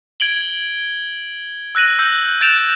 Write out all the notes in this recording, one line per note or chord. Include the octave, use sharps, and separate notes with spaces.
G#6 D7 F#7 G7
E6 F#6 A#6 D#7 F#7
E6 F#6 G6 A#6 F#7
F#6 G6 A6 D7 E7 F7